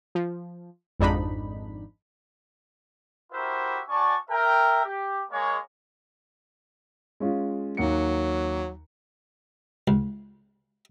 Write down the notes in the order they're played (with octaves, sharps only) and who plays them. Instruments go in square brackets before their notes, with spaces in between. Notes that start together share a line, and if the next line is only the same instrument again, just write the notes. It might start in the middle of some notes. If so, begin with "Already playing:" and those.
[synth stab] F3
G#1 F2 G#2 D4 D#4 B5
[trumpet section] E4 F#4 G4 A#4 C5 E5
C#4 F#4 D5 G#5 A5 C#6
A#4 E5 G5
G4
G#3 A#3 C#5
[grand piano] G#3 C#4 F4
[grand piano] D#2 F#5 C#7 [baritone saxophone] F#3
[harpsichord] C#2